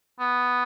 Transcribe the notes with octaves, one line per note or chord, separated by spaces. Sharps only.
B3